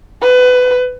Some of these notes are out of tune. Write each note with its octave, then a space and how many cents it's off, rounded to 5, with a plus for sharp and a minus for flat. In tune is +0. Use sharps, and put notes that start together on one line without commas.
B4 +20